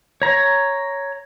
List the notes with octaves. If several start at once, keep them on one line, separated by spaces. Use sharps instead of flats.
C#5 A#5